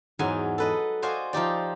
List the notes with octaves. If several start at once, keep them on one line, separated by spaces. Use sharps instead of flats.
E2 G#2 F#3 D#4 G#5
A4 B4 D#5
F#4 C5 D5 D#5 F5 G#5
F3 D#4 G4 D5